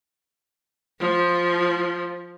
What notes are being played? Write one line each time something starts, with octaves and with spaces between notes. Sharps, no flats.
F3